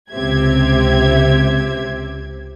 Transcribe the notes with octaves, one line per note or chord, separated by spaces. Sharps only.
C#2 C3 C4 G4 E5 G#6